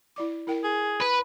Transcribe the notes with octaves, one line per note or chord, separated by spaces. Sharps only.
E4 D5 D6
E4 A#4 G5
G#4
B4